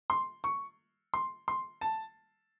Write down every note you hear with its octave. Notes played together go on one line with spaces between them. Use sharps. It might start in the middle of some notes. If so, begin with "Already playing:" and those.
C6
C#6
C6
C6
A5